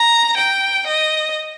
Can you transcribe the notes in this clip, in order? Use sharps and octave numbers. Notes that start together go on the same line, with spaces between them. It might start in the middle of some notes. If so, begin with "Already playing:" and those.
Already playing: A#5
G5
D#5